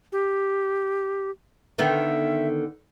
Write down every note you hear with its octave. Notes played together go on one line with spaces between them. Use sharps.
G4
D3 D#3 B3 E5